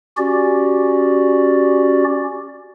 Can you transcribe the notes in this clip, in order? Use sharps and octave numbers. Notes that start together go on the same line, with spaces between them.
C#4 F#4 G4 D5